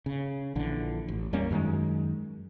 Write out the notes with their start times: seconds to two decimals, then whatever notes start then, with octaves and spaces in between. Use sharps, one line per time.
0.06 C#3
0.55 A#1 D3 E3
1.08 A1
1.33 E2 G3 A#3 C#4
1.51 F#2 D#3 G#3